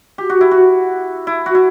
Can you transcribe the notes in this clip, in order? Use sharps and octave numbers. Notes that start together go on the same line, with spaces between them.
G4
F#4
E4
F#4
E4
F#4
E4